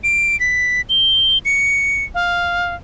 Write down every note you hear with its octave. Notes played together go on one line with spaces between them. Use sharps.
D7
B6
G7
C#7
F5